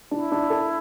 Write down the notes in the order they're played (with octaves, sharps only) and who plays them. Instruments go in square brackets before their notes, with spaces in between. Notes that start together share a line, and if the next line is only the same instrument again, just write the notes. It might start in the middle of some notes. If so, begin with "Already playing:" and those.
[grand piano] D4 [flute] E4
[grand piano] D4
A4